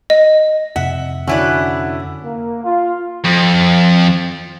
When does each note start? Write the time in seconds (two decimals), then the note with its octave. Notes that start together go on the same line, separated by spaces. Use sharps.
0.10 D#5
0.76 F2 C3 E5 F#5
1.27 D3 C#4 E4 F#4 B4 D5
2.23 A#3
2.63 F4
3.24 F2